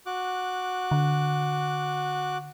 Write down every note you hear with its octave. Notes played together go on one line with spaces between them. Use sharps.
F#4 D6 F#6
D3